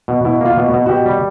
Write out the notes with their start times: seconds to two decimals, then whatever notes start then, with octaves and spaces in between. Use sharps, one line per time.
0.08 B2
0.25 B2 E4
0.41 A#3 F4
0.57 B2
0.68 F#4
0.73 B2
0.86 F#4
0.89 B2 G4
1.06 G3